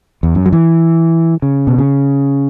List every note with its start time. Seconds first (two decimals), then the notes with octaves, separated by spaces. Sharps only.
0.23 E2
0.35 F#2
0.46 F#3
0.53 E3
1.42 C#3
1.67 B2
1.78 C#3